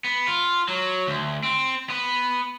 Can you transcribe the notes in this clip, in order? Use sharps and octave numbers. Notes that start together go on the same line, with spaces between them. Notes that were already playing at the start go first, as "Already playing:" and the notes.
B3
F4
F#3
D2
C4
B3